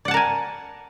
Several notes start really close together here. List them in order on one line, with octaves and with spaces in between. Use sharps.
D5 F#5 A5 A#4 G#5